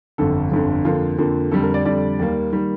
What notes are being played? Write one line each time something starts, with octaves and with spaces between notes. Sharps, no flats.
G1 F2 D3 A4
G1 F2 D3
F2 D3 F3 A#3 F4
F2 D3 F3 A#3
F2 D3 G3 A4
A#4
D5
F2 D3 G3 D5
D#2 D#3 G3 A#3
D#3 G3 A#3